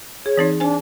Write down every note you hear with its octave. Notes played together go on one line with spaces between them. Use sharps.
G#4 C#5
E3 C4 D#4
D4 C5 G#5